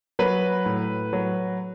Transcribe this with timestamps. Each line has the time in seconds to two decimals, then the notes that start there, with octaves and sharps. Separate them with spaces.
0.19 F#3 B4
0.65 A2
1.13 F#3